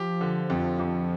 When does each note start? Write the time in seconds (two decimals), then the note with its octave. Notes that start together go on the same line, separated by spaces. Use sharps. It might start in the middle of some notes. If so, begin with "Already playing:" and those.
Already playing: F3 G4
0.21 D3
0.50 F2
0.79 F2